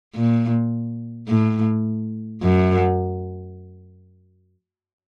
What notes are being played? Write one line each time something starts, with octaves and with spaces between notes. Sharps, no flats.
A#2
A2
F#2